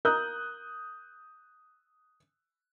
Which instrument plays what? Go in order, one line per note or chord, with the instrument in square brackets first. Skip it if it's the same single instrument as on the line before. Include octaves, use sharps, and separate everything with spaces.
[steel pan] A#4 [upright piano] D#6 F#6 G6